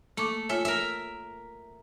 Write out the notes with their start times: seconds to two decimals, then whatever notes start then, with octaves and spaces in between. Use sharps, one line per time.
0.17 A3 A#3 C#6 D6
0.49 F4 C#5 E5 G#5
0.65 A#4 E5